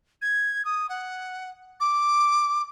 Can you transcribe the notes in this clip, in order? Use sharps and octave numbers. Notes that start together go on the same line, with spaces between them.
G#6
D#6
F#5
D6